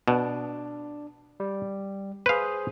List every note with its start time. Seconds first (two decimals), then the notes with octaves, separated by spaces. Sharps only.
0.08 B2 D4
1.40 G3
2.26 G#4 B4 C5 F5